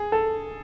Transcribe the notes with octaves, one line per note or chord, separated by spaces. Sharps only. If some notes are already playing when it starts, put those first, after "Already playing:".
Already playing: G#4
A4